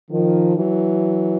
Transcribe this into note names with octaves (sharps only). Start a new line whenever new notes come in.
D#3 F3
E3 F#3